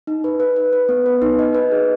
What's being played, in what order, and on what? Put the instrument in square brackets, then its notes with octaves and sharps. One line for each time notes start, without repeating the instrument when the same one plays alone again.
[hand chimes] D#4
B4
B4
B4
B4
B3
B4
D#4
D#5
B4
G#4